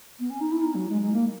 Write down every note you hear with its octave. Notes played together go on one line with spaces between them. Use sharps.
B3
C#4
D#4
E4
D#4
F#3
G#3
G#3
A#3